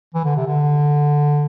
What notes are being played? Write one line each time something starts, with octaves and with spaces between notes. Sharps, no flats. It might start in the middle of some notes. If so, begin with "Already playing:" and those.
E3
D3
C3
D3